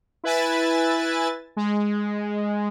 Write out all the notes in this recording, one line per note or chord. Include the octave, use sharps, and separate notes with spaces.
E4 B4 E5 G#5 A6
G#3